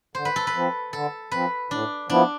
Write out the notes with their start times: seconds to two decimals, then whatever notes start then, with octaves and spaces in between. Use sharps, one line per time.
0.15 D3 C5
0.25 B4
0.36 A4
0.47 B4
0.54 F3 C4
0.93 D3 A4
1.31 F3 C4 B4
1.70 A2 D4
2.09 F3 B3 D4 E4